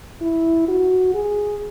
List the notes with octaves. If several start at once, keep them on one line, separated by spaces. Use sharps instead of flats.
E4
F#4
G#4